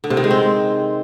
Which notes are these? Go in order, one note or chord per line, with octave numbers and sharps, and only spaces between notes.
D3
C3
D#3
G#3
C4